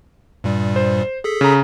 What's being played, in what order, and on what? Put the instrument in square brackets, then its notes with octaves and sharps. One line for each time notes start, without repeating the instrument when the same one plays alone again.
[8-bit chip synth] G2 A#2 G3
[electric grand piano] C5
[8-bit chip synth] G#4 A4 B6
[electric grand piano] C#3 A#5